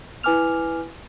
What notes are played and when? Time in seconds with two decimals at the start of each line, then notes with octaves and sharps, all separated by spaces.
0.23 E4 B4 G#5 D6 F6 F7